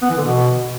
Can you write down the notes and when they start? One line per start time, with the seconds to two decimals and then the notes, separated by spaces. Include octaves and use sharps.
0.02 B3
0.10 E3
0.17 D3
0.25 B2